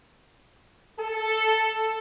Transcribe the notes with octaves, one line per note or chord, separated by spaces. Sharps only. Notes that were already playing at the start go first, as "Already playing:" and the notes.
A4